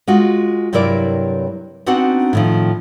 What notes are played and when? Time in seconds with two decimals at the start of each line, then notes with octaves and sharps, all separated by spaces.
0.07 G#3 F4 F#4
0.73 G2 C3 F#3 E4 A#4 D5
1.86 B3 C4 D4 D#4 F#4 F#5
2.33 A2 D#3 F3